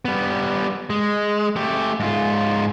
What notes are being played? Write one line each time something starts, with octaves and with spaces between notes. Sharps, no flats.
G3 B3
G#3
A3 G4
G#2 F4